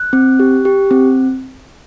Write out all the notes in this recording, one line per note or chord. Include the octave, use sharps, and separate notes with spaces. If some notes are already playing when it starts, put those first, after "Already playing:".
Already playing: F#6
C4
G4
G4
C4